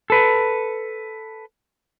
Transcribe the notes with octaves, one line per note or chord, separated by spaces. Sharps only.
A4 B4